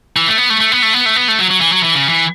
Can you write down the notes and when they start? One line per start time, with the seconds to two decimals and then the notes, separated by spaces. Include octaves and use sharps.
0.16 E3
0.28 A3
0.38 B3
0.50 A3
0.61 A3
0.72 B3
0.82 A3
0.94 B3
1.06 A3
1.16 B3
1.28 A3
1.39 F#3
1.51 F#3
1.61 E3
1.72 F#3
1.83 E3
1.95 C#3
2.09 E3